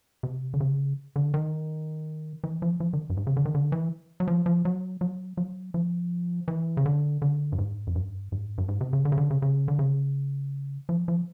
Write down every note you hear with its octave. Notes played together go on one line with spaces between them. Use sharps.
C3
D3
C#3
D3
D#3
E3
F3
F3
D#3
G2
G#2
C#3
D3
D#3
D3
E3
F#3
F3
F3
F#3
F#3
F#3
F3
E3
C#3
D3
D3
G2
G#2
F#2
G2
G#2
G2
G#2
C3
C#3
D3
C#3
D3
C#3
C#3
D3
C#3
F3
F3